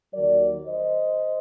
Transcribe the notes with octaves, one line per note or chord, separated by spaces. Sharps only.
D#2 D#3 F#3 A#4 D5
C5 D#5